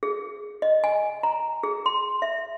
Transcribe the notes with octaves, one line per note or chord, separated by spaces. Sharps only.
G#4
D#5
G#5
A#5
G#4
C6
E5